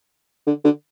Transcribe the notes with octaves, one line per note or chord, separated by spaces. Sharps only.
D3
D3